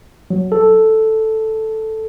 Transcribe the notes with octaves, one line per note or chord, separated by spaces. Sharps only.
F#3
A4